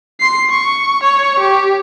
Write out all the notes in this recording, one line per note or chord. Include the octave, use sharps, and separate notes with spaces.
C6 C7
C#6
C#5 C#6
G4